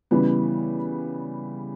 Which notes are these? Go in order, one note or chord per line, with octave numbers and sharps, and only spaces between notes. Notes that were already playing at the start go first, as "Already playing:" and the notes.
C#3 E3 G3 B3